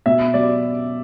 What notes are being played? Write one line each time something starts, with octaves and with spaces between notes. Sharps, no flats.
B2 E5
F#3 D5